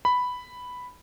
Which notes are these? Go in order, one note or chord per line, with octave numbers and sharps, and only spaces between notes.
B5